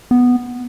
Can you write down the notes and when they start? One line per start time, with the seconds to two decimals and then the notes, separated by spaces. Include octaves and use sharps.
0.11 B3